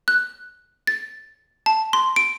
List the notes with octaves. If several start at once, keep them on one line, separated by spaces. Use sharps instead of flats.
F#6
A6
A5
C6
D7